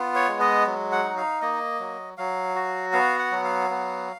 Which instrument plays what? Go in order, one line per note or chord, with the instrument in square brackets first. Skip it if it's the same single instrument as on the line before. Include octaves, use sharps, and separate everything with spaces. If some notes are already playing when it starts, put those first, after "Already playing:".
Already playing: [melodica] B3 F4
C#5
G#3
D#5
F#3
F#5
D#4
F5
A#3 D#5
F#3
F#3 F5
F#4
B3 F5
F#5
F#3
F5
B3